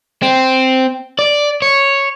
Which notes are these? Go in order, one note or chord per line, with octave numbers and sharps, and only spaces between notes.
C4
D5
C#5